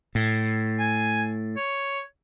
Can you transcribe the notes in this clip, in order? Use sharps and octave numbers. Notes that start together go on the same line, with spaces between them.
A2
G#5
C#5